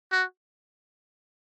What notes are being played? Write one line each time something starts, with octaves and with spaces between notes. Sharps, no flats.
F#4